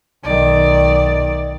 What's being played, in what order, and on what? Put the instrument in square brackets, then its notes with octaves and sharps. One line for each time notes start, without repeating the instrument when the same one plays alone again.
[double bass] B1 D#3 [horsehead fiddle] D5